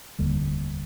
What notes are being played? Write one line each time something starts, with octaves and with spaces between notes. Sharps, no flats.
F1 D#2 D3 G3